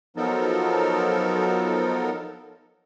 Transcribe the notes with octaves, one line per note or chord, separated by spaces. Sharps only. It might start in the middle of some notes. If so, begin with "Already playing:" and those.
F3 F#3 B3 D#4 A4 A#4